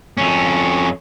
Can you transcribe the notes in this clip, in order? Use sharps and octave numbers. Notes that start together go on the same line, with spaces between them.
F2 C#4